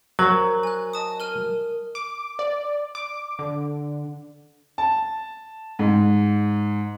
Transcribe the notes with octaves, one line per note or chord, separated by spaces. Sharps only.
F#3 A#4 C5 F#7
G#5 F#6
D#5 A5 D#6
A#4 F6 D#7
D6
D5
D6
D3
A5
G#2